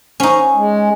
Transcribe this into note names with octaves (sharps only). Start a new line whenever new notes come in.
C#4 D#4 C5 F#5 C#6
G#5
G#3